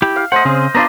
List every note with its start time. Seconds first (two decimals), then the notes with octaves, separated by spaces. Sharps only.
0.02 E4 G4
0.16 F5
0.32 A3 C5 D#5 F#5
0.45 C#3 C4 G#4
0.75 B3 D4 F4 D5 D#5 A#5